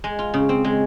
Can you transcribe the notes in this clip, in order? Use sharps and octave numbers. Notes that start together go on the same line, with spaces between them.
G#3
F4
C#3
C4
G#3